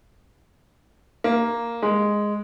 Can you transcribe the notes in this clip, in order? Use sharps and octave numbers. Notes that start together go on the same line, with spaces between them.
A#3
G#3